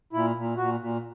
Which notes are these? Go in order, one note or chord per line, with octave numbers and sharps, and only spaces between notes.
A#2 E4
A#2
A#2 F#4
A#2